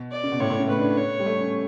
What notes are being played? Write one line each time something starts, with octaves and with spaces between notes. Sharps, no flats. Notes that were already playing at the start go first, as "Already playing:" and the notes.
Already playing: B2
D5
C#3
B2
A2 C#5
A2
C#3
A3 B4
D4
C#5
G3
A3
C#4